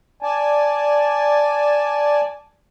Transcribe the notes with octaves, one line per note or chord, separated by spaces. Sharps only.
D5 G#5 A5